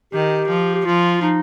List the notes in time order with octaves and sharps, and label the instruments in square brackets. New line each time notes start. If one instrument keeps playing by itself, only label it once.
[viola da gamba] D#3 [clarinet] G4
[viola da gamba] F3
[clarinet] G4
[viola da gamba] F3 [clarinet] F4
[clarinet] D#4